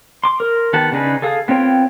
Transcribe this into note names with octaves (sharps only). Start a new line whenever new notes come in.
C6 D6
A#4
D#3 B3 G4 F#5 A5
C#3 D4 D#4 G#4 B4
G#4 A4 F5 D#6
B3 C4 F4 C#5 G5